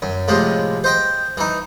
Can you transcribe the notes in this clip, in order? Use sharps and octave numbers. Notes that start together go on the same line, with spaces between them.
F#2
A2 C3 F3 G#3
C5 D#5 G5
E3 D#4